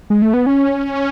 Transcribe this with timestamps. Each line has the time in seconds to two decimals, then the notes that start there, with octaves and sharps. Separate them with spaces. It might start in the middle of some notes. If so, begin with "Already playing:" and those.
0.10 G#3
0.22 A3
0.34 B3
0.46 C#4